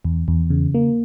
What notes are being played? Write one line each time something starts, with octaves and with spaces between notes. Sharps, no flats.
E2
E2
C#3
A#3